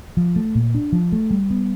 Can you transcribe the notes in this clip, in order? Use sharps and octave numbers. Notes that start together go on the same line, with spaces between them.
F3
A3
A#2
D4
F3
A3
G3
B3